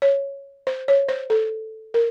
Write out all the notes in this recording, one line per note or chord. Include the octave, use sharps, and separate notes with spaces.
C#5
C5
C#5
C5
A4
A#4